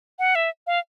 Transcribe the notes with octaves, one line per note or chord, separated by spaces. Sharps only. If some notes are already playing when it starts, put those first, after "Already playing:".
F#5
E5
F5